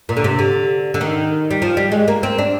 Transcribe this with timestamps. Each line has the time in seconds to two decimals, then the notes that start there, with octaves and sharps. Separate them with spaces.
0.09 A#2
0.17 D3
0.24 C3
0.39 D3
0.94 D3
1.01 D#3
1.50 G3
1.62 F3
1.77 G3
1.92 G#3
2.08 A#3
2.23 C4
2.38 D4